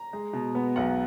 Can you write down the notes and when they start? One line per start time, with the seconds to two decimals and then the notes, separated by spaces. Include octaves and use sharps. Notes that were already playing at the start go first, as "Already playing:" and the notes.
Already playing: A#5
0.13 G#3
0.33 B2
0.55 B3
0.76 B1 F#5